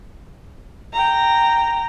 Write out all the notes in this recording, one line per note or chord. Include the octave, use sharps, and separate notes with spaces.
G5 A#5